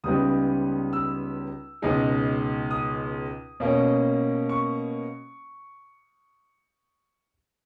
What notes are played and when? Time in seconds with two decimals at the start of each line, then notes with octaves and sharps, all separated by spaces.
0.04 C#2 C#3 G3 B3 D#4 D#6
0.93 E6
1.82 C#2 B2 G#3 D#4
2.71 D#6
3.60 B2 A#3 C#4
4.49 C#6